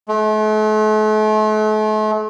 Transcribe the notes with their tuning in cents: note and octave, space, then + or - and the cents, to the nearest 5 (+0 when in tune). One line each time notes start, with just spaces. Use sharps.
A3 -40